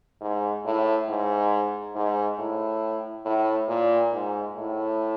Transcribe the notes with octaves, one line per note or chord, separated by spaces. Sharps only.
G#2
A2
G#2
G#2
A2
A2
A#2
G#2
A2